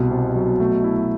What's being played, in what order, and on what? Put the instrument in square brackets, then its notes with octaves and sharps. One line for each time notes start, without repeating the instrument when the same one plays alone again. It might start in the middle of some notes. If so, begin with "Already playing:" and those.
Already playing: [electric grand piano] C2 [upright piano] B2
[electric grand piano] C3
F#3
A3
E4